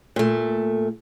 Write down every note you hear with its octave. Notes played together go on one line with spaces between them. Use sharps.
A#2 A3